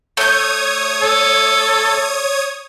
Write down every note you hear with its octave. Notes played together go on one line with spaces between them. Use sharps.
A3 C#5 D#6 G6 G#6
A4